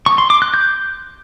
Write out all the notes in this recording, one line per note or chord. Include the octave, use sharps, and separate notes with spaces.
C#6
C6
D6
F#6
G6